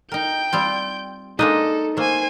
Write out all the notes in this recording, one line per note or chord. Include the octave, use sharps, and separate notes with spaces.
D#4 A#4 G5 G6
G3 C4 F4
G#3 A#3 D4 D#4 A4 D#5
A3 A#3 C5 G#5